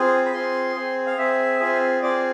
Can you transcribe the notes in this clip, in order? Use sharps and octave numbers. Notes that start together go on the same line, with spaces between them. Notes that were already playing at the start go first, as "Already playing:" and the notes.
Already playing: C4 F4 G#4
B5
C4 F4 G#4 C6
C4 G#4
F5
C4 G#4 E5
C4 F4 G#4
C4 F4 G#4 D5